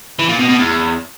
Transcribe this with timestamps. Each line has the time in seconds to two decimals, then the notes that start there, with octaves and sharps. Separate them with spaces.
0.19 E3
0.29 A#2
0.39 B2
0.49 B2
0.59 E2